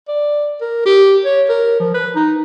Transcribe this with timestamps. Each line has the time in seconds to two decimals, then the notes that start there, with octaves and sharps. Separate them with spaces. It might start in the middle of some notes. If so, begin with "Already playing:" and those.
0.08 D5
0.61 A#4
0.86 G4
1.25 C#5
1.49 A#4
1.80 F3
1.94 B4
2.15 D#4